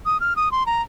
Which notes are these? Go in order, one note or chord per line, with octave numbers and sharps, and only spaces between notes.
D#6
F6
D#6
C6
A#5